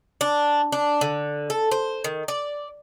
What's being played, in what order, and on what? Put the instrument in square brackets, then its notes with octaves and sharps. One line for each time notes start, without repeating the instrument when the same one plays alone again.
[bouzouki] D4
D4
D3
A4
C5
D#3
D5